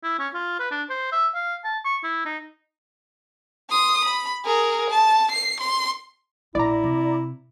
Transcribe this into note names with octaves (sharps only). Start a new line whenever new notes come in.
E4
C#4
F4
B4
D4
C5
E5
F5
A5
C#6
E4
D#4
C6 D#6
B5
G#4 A#4
A5
C7
C6
A#1 E4 D5 A#5
C3